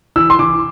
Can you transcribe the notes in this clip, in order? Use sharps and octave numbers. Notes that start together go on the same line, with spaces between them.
E3 E6
C6
E3 D6